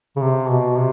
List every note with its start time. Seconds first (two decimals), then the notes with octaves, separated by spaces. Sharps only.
0.16 C#3
0.22 C3
0.50 B2
0.77 C3